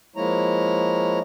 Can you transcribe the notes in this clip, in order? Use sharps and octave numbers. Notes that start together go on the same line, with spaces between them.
F3 G#3 A#3 E4 C#5 A#5